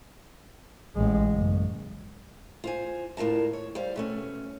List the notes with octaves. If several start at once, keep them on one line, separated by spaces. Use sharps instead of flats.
A1 G#3
F#1
F4 C5 G#5
D2 A2 F4 A#4 A5
C#5
G3 C5 F5
B2 A3 C#4